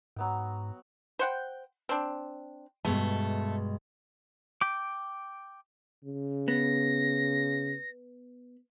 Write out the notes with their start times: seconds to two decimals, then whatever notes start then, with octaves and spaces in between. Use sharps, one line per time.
0.16 G#2 F#3 B3 G5
1.19 C5 F#5 G5
1.89 C4 D4
2.85 G2 B2 G#3 A3
4.61 G5 D6
6.05 C#3
6.48 B3 A#6